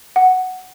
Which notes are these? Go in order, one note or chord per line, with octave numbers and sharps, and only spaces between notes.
F#5